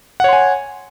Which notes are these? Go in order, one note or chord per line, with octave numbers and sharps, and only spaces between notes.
C#5 F#5 G#5 C6